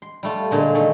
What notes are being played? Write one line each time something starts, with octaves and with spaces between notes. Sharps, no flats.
C6
G3 A3 F4
A#2 D3 G#3
D#3 A3 A4